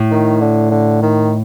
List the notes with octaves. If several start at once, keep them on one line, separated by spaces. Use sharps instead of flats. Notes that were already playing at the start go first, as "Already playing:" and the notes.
Already playing: A2
D#3
D3
D3
D#3